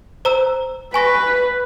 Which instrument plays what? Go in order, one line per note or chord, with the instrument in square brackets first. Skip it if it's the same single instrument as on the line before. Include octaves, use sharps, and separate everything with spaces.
[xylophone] C5 A#5 E6
[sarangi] B4 [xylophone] G#5 C#6 A#6